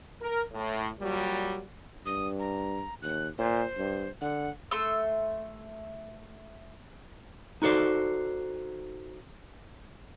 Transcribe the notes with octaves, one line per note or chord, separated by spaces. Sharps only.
A#4
A2
A#2 F#3 G3
G2 D#6
A#5
D#2 F#6
A#2 C5
G2
D3 F#5
A3 C6 E6
D#4 F#4 A4 C5 D5